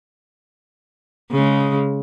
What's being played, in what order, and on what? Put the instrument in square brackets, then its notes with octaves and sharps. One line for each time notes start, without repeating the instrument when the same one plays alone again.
[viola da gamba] C#3 G#3